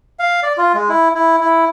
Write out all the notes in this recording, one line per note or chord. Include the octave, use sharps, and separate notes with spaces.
F5
D5
F4
G#3
E4
E4
E4